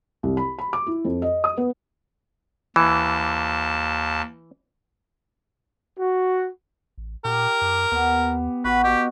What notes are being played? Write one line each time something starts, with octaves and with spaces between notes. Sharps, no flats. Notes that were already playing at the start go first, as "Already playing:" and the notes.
C2
B5
B5
D6
E4
F2
D#5
D#6
B3
D#2 E3 A5
F#4
A1
A#2 G4 A#4
F#2
D#2 B3
A1 F#4 B4
B2 G4